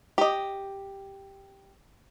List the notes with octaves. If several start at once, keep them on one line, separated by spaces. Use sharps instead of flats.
G4 D#5